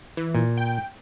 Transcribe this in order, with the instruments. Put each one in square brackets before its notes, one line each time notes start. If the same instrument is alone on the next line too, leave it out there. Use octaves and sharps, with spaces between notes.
[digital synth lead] E3
[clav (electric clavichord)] A#2
[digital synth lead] G5